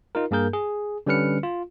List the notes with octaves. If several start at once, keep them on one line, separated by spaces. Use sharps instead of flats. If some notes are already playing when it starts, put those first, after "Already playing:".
D#4 F4 A#4
G2 A#3 G#4 A#4 G6
G#4
D3 G3 C#4 B4 F6 C#7
F4